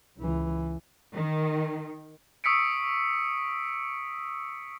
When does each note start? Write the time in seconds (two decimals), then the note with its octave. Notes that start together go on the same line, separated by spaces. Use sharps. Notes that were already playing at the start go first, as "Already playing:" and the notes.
0.18 C#2 E3
1.13 D#3
2.44 C#6 D#6 E6 B6 C#7 D7